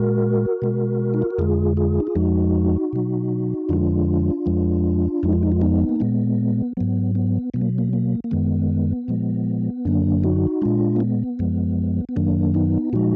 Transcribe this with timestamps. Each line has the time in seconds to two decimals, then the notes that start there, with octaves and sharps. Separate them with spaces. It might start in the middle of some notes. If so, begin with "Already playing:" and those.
Already playing: A#2 G#3 F#4 A#4
0.62 B2 G#3
1.14 D#4
1.22 F4
1.30 F#4
1.38 F2 D3 G#3 F4 G#4
1.77 F4 G#4
2.00 D#4
2.07 F4
2.15 F2 F3 G#3 D#4 F#4
2.93 B2 F#3
3.69 F2 D3 F3 G#3 D4 F4
4.46 F2 F3 G#3
5.23 F2 F3 G#3 D#4
5.33 F4
5.43 D#4
5.52 F4
5.61 B3 D#4
5.89 A#3
6.00 A#2 G#3 B3
6.77 G#2 F#3 B3
7.15 B3
7.54 B2 F#3 B3
7.61 A#3
7.78 A#3
7.93 A#3
8.24 A#3
8.31 F#2 D#3 G#3 B3
9.08 A#2 F3 G#3
9.85 F#2 D3 F#3 A#3 D4
10.23 D#4 F#4
10.62 A#2 G#3 D4 F4
10.96 A#3
11.00 B3
11.39 F#2 F3 G#3
12.09 B3
12.16 F#2 D#3 F#3 A#3 D4
12.54 B3 D#4
12.93 A#2 F3 G#3 D#4 F#4